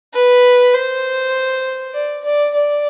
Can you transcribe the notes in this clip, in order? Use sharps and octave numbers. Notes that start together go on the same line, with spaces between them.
B4
C5
D5
D5
D5